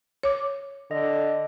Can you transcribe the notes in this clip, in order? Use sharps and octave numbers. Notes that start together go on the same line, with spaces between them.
C#5 D6
D3 D#5